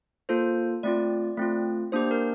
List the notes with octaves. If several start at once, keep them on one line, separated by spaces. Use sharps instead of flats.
A#3 F4 A4 C5
A3 C4 F4 D5
A3 C4 F4
A#3 D4 G4 C5
A#4